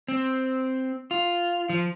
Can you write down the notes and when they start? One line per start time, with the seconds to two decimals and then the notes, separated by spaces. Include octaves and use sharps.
0.08 C4
1.11 F4
1.69 F3